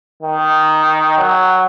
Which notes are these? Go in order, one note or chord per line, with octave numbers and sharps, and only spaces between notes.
D#3
F#3